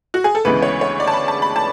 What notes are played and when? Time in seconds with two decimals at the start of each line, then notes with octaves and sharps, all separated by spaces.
0.14 F#4
0.24 G#4
0.35 A4
0.45 D2 C#3 E3 G#3 B3 B4
0.62 C#5
0.81 C#5
1.00 D5
1.07 A5
1.13 B5
1.28 A5
1.42 B5
1.56 A5